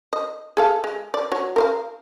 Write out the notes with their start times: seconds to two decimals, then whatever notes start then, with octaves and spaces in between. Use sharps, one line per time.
0.13 D#5
0.57 G#4 A4 F5
0.84 G#3
1.14 D5
1.32 F#3 C#5
1.56 A#4 C5 F5